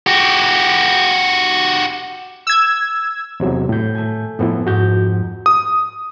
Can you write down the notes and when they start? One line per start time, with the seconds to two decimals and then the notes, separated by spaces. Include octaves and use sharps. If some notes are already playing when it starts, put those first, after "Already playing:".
0.07 F#4 G4
2.47 E6 G#6
3.40 E2 C3 F#3
3.69 A2 G6
3.95 A3 G#5
4.39 F2 A2 B3 E4
4.67 G#2 F#4 G6
5.46 D#6